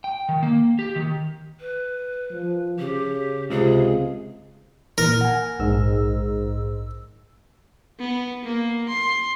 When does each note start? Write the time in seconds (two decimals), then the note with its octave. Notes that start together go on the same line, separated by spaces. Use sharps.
0.04 G5
0.29 D#3
0.43 A#3
0.79 G4
0.96 D#3
1.60 B4
2.32 F3
2.79 C#3 G4
3.50 C#2 C3 F4 G#4
4.98 A#2 E3 A#4
5.21 F#5 G#5
5.59 A#1 G#2 E6
7.99 B3
8.44 A#3
8.89 C6